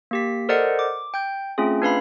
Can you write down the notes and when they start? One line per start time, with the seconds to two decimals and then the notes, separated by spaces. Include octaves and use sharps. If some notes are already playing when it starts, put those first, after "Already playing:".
0.11 A#3 G4 B6
0.49 A4 A#4 C5 D5 D#5 F#5
0.79 D6
1.14 G5 G6
1.58 A3 C4 C#4 F4 G#4
1.82 D4 B4 F5 B5